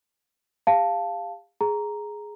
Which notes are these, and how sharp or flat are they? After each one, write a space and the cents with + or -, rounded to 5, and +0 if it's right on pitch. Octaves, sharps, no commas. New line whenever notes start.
G4 +40 F5 +0 A5 +0
G#4 +5 A#5 +0